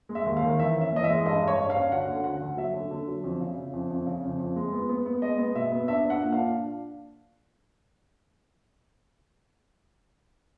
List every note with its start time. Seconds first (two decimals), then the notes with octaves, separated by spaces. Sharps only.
0.09 G#3
0.15 E5
0.26 D#2
0.37 F5
0.43 D#3
0.59 E3 E5
0.76 C#4
0.81 E5
0.92 E3 D#5
1.04 E5
1.09 G#3
1.26 G2 D#5
1.42 G2
1.48 C#5
1.58 G2
1.70 F5
1.75 C#4
1.92 D2 F#5
2.08 D3
2.24 D2 F#5
2.42 D2
2.57 F#3 E5
2.74 D3
2.91 D3
3.08 F#3
3.24 F2
3.41 C#3
3.57 C#3
3.73 F2
3.90 F2
4.06 C#3
4.24 F2
4.40 F2
4.56 G#3
4.73 B3
4.89 B3
5.06 B3
5.22 G#3 D#5
5.38 B3
5.55 B2 E5
5.72 B3
5.88 D4 E5
6.05 D4 F#5
6.22 A#2
6.33 D4 F5